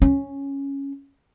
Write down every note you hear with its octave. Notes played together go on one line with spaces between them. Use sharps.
C#4